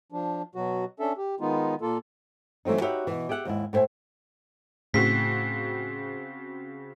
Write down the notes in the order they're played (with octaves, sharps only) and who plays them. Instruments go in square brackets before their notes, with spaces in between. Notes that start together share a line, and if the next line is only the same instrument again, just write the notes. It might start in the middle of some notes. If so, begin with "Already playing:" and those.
[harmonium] F3 D4
B2 F#3 F#4
C#4 D4 A4 E5
G4
D#3 G#3 B3 D#4 F4
A#2 A#3 F4 A4
[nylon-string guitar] E3 F#3 A3 C4 D#4
D#4 F#4 G4 B4 C#5 E5
B2 E3
G4 G#4 E5 F#5
D#2 G#2 E4
A2 B4 C5 E5 G#5
[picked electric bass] A2 [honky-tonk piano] C#3 C4 F#4 [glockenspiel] B6